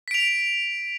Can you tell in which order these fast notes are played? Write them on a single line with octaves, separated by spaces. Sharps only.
B6 D7 F7